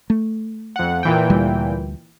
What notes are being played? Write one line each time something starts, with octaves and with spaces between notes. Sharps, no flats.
A3
F2 F#5
A#2 E3 G5
D2 G3